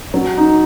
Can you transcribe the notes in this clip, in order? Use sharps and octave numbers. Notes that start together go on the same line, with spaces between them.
F#3
D#4